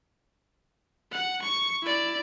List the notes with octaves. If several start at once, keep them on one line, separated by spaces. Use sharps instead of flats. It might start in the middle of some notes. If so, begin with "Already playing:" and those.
F#5
C#6
E4 D5